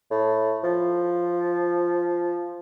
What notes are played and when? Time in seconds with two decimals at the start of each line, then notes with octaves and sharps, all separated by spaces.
0.11 A2
0.64 F3